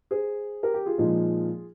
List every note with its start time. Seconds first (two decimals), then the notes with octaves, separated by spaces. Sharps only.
0.11 G#4 C5
0.63 G4 A#4
0.74 G4
0.86 F4 G#4
0.98 A#2 F3 G#3 D#4